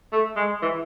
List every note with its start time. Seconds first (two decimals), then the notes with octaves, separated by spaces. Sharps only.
0.13 A3
0.37 G#3
0.62 E3